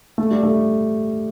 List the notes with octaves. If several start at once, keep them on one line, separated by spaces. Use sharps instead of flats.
A3
G3
A3